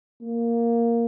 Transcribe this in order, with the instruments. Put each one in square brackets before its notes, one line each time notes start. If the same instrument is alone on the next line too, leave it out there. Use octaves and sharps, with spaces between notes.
[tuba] A#3